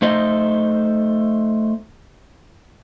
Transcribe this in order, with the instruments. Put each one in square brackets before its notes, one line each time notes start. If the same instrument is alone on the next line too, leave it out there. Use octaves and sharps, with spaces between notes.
[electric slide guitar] A3 D#4 C5 D#5